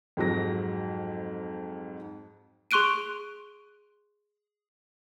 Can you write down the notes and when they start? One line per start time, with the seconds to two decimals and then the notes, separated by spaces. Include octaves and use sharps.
0.17 F2 G#2 F#3 A#6
2.71 G#4 C6 C#6 F#6 D7 D#7